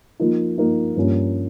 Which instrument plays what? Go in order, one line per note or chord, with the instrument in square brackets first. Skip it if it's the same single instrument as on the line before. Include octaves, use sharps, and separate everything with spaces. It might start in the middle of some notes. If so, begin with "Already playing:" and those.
[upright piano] F3 A#3 D#4
F3 A#3 D#4
G2 F3 A#3 C#4